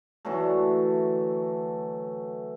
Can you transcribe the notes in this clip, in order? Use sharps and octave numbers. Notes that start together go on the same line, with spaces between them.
D3 E3 F#3 A3